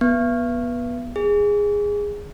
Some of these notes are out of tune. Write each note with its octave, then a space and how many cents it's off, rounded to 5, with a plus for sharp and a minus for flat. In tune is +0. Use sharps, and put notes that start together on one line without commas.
B3 -20
G#4 -10